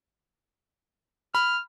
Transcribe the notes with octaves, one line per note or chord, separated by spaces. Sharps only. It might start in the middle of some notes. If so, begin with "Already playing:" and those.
B5 F6